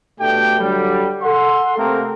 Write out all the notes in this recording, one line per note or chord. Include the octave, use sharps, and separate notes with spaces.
B2 A3 D4 G4 G5
D3 F#3 G3
A4 F#5 C6
C3 A3 A#3 C4 A#4